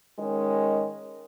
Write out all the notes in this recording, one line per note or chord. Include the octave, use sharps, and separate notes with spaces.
D#3 G#3 C#4